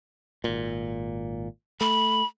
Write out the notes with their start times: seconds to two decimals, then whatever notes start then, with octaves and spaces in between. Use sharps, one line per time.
0.44 G#1 A#2
1.81 A3 B5